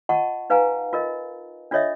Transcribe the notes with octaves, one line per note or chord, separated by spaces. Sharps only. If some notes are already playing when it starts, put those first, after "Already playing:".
F4 D#5 F#5 A5 C#6
D#4 B4 F5 G#5 A#5
F4 A#4 D#5
D4 F4 A4 C#5 D#5 E5